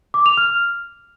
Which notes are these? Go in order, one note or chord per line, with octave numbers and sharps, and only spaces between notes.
D6
F7
F6